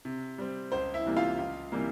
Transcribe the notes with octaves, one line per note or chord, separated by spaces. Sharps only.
C3
G3 C4
C#2 C5
E4 E5
C3 E3 G3 A#3
F4 F5
C#2
C3 E3 G3 A#3